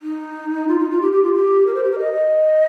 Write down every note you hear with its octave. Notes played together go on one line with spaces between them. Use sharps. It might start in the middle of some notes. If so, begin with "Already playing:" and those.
D#4
F4
D#4
F4
G4
G4
F4
G4
A#4
C5
G4
A#4
D#5